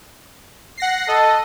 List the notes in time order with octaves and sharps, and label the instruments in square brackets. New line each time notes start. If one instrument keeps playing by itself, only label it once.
[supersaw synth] F#5 A#6 C7
[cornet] A4 [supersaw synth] D#5